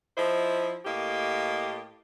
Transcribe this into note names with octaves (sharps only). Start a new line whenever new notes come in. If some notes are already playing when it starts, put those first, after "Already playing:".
F3 E4 C5 D#5
A2 A#3 G4 D#5